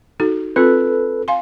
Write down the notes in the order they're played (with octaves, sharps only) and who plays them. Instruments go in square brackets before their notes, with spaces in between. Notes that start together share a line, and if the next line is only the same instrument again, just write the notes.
[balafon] D#4 F#4 A4
[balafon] C4 F4 [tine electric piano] A4 B4
[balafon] F5 G#5 C6